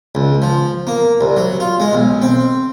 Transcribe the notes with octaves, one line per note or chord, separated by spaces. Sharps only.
C#2
F3
A#3
C2
F#3
F4
G#3
B1
C4